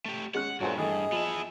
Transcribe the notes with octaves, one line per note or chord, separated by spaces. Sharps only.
A3 G4
G#3 C#4 F#5 F#6
G2 A#2 F#3 G#3 F#4 A4 C5
E3 A3 G#4 D#5
F3 B3 E5